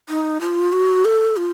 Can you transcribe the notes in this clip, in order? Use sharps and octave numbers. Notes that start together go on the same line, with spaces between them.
D#4
F4
F#4
A4
F4